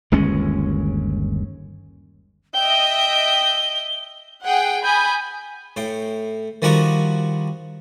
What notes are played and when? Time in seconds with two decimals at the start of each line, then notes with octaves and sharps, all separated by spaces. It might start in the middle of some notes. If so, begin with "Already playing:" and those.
0.12 G1 D#2 G#3 C#4
2.54 D#5 E5 G5 G7
4.45 G#4 F#5 G5
4.83 G#5 B5 D#6 G6
5.76 A2 G5
6.62 D#3 F3 G3 F#4 A#5 D6